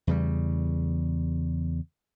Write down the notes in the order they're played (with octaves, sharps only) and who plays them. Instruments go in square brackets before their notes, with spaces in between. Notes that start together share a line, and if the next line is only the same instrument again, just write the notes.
[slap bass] E2 C#3 G3